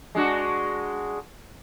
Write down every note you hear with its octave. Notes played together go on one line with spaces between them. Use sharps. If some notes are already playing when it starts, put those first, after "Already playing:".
G#3 D4 F#4